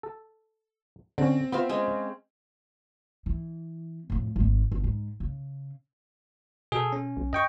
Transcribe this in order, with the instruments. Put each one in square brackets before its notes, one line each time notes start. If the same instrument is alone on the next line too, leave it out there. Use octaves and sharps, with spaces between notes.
[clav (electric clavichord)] A4
[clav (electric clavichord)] D3 C#4 [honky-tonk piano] C4
[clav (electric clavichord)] B3 F4 [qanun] C5 E5 F5
[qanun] G#3 C#4 C5
[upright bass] E3
F2 A2
G#1 D#3
G1
G#2
C#3
[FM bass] B2 [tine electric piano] G#4 A4
[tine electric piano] C#4
[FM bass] B1
[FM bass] F#2 [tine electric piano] D#5 G5 C#6